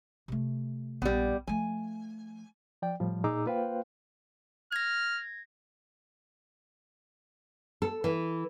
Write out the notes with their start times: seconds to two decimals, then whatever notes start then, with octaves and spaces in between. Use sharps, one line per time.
0.28 C3 A3
1.02 A#1 G3 B3
1.47 F3 A3 G#5
2.82 F3 D5 G5
3.00 A2 F3 G3
3.24 A#2 D#4 G#4 A#5 D6 E6
3.46 A#3 F4 B4 C5 F5 G5
4.72 F6 G#6 A#6
7.82 A4
8.04 E3